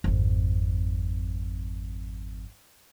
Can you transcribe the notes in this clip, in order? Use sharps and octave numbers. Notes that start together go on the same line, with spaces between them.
G#1 F2